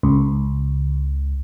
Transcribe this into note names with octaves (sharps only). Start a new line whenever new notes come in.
C#2